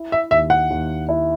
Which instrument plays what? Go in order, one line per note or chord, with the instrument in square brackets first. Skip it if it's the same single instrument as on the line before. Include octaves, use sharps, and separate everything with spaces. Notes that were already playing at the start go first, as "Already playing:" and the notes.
Already playing: [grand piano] E4
[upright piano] E5
[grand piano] D#2 [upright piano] E5
[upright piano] F#5
[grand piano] D#2
E4